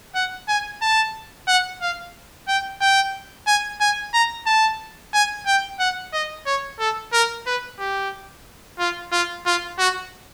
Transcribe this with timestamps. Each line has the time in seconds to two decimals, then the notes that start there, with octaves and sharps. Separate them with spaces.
0.15 F#5
0.48 G#5
0.81 A5
1.47 F#5
1.81 F5
2.48 G5
2.81 G5
3.47 G#5
3.80 G#5
4.13 A#5
4.46 A5
5.14 G#5
5.46 G5
5.79 F#5
6.13 D#5
6.46 C#5
6.79 A4
7.13 A#4
7.46 B4
7.80 G4
8.79 F4
9.12 F4
9.46 F4
9.78 F#4